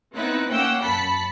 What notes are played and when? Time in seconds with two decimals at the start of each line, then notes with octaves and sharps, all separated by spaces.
0.15 B3 C4 D#4 E4 F#6
0.50 A#3 C#4 F#5 G5 E6
0.81 F#2 A5 B5 B6 C#7